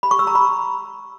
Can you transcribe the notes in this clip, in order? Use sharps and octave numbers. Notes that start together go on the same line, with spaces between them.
B5
C#6
E6
A#5
B5